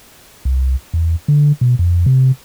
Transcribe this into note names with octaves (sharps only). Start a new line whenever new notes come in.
C2
E2
D3
B2
F2
C3